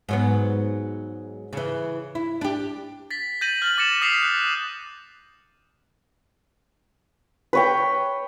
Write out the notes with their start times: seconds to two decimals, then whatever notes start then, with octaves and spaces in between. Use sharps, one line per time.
0.09 G#2 F#3 B3
1.53 C#3 E3
2.15 E4
2.41 D4 G4
3.11 A6 B6
3.41 G6 A6 A#6 D#7 F#7
3.62 F6 A6 F#7
3.78 D6 A6 A#6 C#7 E7
4.02 D#6 A6 B6 C7 E7 F7
4.23 F#6
7.53 B4 C#5 G5